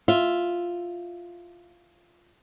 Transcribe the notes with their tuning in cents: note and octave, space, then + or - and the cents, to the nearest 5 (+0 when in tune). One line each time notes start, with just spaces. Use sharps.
F4 +0 E5 +0